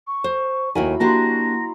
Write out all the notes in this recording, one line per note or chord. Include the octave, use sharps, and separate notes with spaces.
C#6
C5
D#2 F#3 E4 A#4 G#5 B5
A#3 D4 F#4 G4 A#5 C6 A#6